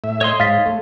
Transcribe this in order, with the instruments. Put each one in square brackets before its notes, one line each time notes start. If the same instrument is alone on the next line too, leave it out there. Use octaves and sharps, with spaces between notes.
[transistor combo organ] A2 E5
[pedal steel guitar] C#5 D#5 C6
[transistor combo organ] G#2 [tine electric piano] F5 A6 B6
[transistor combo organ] A3